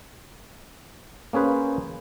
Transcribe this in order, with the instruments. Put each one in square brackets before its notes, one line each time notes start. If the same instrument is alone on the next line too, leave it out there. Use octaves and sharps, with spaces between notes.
[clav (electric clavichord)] A#3 C#4 G#4 B4 C5